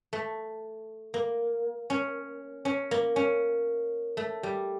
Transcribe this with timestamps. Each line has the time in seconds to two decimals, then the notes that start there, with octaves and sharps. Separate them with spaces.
0.13 A3
1.14 A#3
1.90 C#4
2.65 C#4
2.91 A#3
3.16 C#4
4.17 A3
4.43 G3